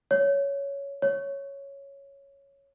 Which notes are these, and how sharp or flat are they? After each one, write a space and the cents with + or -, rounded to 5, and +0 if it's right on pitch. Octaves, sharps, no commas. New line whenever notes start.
C#5 +10
C#5 +0